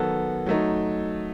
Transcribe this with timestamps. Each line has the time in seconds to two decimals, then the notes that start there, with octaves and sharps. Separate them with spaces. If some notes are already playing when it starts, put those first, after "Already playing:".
Already playing: D#3 F#3 B3 F#4 A4
0.46 F#3 A3 D#4